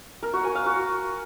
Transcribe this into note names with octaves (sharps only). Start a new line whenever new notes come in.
A#4
F#4
G#5
F5
F#4